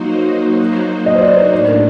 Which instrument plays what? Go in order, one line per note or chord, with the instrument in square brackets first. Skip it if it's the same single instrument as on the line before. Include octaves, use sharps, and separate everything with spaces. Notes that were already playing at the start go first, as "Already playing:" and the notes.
Already playing: [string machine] F#3 A#3 D#4 F#4 C5
[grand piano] D#5
C5
D5
C5
[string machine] A2 A3 D4 [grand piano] D5
[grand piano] A#4